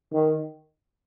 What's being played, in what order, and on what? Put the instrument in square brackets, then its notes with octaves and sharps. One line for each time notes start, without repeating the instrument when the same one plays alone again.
[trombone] D#3